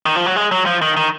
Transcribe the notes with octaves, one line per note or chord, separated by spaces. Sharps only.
D#3
F3
F#3
G#3
F#3
F3
D#3
D#3